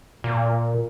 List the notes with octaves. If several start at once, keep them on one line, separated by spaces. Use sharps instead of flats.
A#2